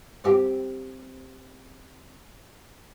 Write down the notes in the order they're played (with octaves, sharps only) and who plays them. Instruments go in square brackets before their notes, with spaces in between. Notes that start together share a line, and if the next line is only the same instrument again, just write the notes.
[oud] C4 G4